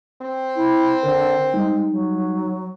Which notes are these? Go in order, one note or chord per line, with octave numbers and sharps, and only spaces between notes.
C4
E4
D3 A#4 C5
G3 G#3 D#4
F#3